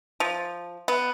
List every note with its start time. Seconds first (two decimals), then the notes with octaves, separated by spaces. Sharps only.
0.20 F3
0.88 B3